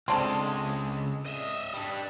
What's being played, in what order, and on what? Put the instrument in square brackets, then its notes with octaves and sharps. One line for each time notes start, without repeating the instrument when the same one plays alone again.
[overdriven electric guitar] C#2 G#3 [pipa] C4 D4 A4
[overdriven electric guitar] D#5 E5
G3 D4